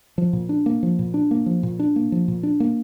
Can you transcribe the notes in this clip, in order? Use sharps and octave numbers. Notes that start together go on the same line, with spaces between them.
F3
A#2
D4
A#3
F3
A#2
D4
A#3
F3
A#2
D4
A#3
F3
A#2
D4
A#3